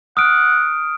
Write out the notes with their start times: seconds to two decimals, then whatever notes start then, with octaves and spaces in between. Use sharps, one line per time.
0.17 F#5 D#6 F6 D7